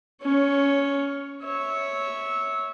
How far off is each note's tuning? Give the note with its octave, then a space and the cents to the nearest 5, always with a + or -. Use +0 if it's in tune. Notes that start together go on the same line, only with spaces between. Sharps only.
C#4 +15 C#5 +0
C#5 +0 E5 -15